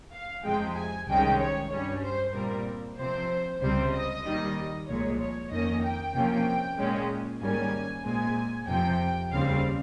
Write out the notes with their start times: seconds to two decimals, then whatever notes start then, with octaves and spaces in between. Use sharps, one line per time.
0.13 F5
0.44 F2 C3 F3 G#3 G5
0.76 G#5
1.08 C2 C3 D#3 G#3 C#4 G5
1.40 C#5
1.71 G2 G3 C#4 C#5
2.03 C5
2.34 A#2 G3 C4 A#4
2.98 C3 F3 C4 C5
3.61 C#2 C3 G3 C4 C5
3.92 D#5
4.25 D#2 D#3 G3
4.87 C2 A#2 F3 G#3 C#5
5.19 C#5
5.51 F2 D#3 A#3 C#4 D#5
5.83 G5
6.14 C3 F3 A#3 C#4
6.78 A#2 G#3 C#4
7.41 G#2 D#3 G3 A#3 C#4 G#5
8.04 A#2 G#3 C4 G#5
8.67 F2 C3 F3 G5
9.31 D#2 C#3 G3 C4 F5